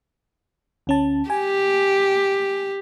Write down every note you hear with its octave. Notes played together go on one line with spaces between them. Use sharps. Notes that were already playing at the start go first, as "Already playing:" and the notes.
D2 C#4 A5
G4 G#5